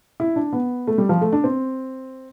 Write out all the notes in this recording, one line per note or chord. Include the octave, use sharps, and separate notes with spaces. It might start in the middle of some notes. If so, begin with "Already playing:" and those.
E4
D4
B3
A3
G3
F3
A3
D4
C4